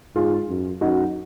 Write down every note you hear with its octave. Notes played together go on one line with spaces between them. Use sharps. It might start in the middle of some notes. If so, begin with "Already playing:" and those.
G#2 F4 G#4
F#2
F#2 D#4 F#4